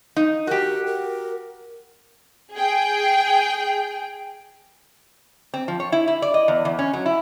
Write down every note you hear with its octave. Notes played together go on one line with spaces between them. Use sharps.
D#4
F#4 G4 A#4
A#4
G#4 G5
C4
F3
C#5
E4
E4
D5
D#5
E2
E2
C#4
F#3
E4